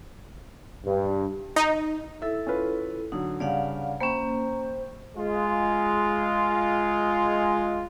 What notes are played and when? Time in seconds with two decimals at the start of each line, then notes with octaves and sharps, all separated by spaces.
0.86 G2
1.56 D#4
2.22 E4 A4 E5
2.47 C#4 F4 B4
3.12 D3 F#3 D#4
3.40 G2 C#3 D5 F5 F#5
4.00 A#3 C#4 C5 G5 B5
5.16 G#3 F4